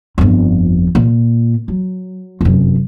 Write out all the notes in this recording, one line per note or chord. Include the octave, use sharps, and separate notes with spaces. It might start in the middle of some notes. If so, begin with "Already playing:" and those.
G1 F2
A#2
F#3
F1 F#2